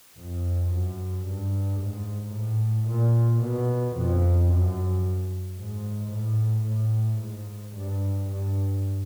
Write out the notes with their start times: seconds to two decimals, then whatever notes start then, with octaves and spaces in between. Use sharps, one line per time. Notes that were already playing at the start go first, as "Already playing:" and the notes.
0.18 F2
0.73 F#2
1.26 G2
1.81 G#2
2.34 A2
2.88 A#2
3.43 B2
3.97 F2
4.51 F#2
5.59 G#2
6.13 A2
6.67 A2
7.21 G#2
7.76 G2
8.29 G2